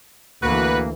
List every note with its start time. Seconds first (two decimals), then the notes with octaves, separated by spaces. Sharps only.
0.43 D2 E3 A#3 F#4 B4